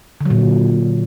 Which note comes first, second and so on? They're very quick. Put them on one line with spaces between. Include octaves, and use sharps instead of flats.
D3 F#3 A#2